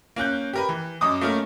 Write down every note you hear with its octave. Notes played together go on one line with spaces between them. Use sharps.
A#3 C#4 F#6 G6
G4 A#4 B4
E3
F#2 D#5 D6 D#6
A3 A#3 C#4 F4 A#4